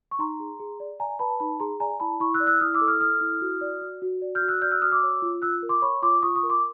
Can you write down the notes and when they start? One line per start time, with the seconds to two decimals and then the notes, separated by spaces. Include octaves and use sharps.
0.11 C#6
0.19 D#4 A#5 C6
0.40 G#4
0.60 G#4
0.80 D5
1.00 D5 G#5 A#5
1.19 B4 A5 B5
1.40 D#4 A5 B5
1.60 G#4 A#5 C6
1.80 D5 G#5 A#5
2.00 E4 A5 B5
2.20 E4 B5 C#6
2.34 E6 F#6
2.40 D5
2.47 E6 F#6
2.61 E4 D#6 F6
2.74 D6 E6
2.81 A4
2.88 D#6 F6
3.00 A4 D#6 F6
3.21 E4
3.41 F#4
3.61 D5
3.82 F#4
4.02 F#4
4.22 D5
4.35 F6 G6
4.42 F#4
4.48 E6 F#6
4.62 D5 F6 G6
4.71 E6 F#6
4.82 F#4 D#6 F6
4.92 D6 E6
5.03 C#5
5.22 F4
5.42 F4 E6 F#6
5.63 A#4
5.69 C6 D6
5.82 C#5 B5 C#6
6.02 F4 C6 D6
6.23 F4 C#6 D#6
6.36 C#6 D#6
6.43 A#4
6.49 C6 D6